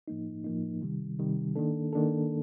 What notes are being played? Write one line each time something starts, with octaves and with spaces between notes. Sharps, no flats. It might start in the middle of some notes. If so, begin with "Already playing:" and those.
A2 F3 A#3 D#4
A2 F3 A#3 D#4
C3 D#3 G3
C3 D#3 G3
D#3 A#3 D4 A4
D#3 A#3 D4 A4